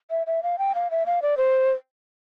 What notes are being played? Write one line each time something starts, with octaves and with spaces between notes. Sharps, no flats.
E5
E5
F5
G5
F5
E5
F5
D5
C5